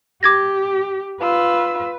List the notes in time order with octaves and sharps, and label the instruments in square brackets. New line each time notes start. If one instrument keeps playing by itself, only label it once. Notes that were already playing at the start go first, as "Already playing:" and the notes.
[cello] G4 [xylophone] D6 G#6 A#6
[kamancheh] F4 E6 [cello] B4